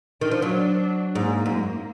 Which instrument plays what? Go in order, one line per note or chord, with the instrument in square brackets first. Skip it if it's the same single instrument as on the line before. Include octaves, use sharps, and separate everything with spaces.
[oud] D#3 [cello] D4
[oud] F3
F#3
[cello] D4
[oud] G#2 [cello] A#3
[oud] F#2